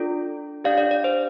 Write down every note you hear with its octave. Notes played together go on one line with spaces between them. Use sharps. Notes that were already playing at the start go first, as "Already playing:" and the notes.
Already playing: D4 F4 A4 D5
D4 G4 D5 F5
D5 F5
D5
C5